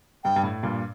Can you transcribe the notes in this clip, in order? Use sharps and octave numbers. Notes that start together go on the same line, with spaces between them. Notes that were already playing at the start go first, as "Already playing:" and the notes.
G2 G5
G2
A2
G2 A#2